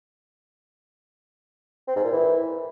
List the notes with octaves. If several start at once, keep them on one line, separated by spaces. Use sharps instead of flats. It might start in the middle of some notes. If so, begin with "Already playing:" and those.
C4
G#2
A#2
E3